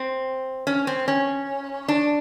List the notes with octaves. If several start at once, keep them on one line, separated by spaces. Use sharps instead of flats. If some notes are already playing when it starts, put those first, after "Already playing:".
Already playing: C4
C#4
C4
C#4
D4